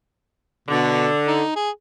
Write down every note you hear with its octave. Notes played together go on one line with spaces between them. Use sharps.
B2 D3
D#4
G#4